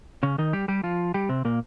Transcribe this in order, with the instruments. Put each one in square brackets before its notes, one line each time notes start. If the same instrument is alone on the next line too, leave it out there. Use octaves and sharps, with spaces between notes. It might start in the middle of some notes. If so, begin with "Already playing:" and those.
[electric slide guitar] C#3 C#4
D#3 D#4
G3 G4
G3 G4
F3 F4
G3 G4
C3 C4
A#2 A#3